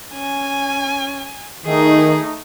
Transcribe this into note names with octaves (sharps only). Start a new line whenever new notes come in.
C#4 G#5
D#3 A3 D#4 G#4